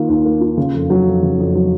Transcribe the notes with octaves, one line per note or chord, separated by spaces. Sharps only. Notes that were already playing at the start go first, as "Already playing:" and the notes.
Already playing: D#3 A#3 F4
D#2
A#3
F4
C#3
F2
F#3
F2
C#3
F2
F#3